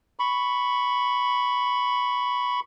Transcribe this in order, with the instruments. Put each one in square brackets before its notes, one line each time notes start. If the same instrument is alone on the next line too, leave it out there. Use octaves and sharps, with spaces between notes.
[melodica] B5 C#6